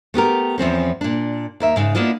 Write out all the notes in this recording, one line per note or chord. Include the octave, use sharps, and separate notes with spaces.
A3 B3 G4 A#4
E2 F3 C4 C#4
A#2 D4
D#2 A#4 E5
G#2 C#3
A#3 B3 D4 E4 F4 D#5